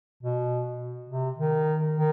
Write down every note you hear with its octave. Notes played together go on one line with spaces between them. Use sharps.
B2
C3
D#3
D#3